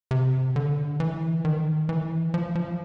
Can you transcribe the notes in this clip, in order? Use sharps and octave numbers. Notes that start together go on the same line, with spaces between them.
C3
D3
E3
D#3
E3
F3
F3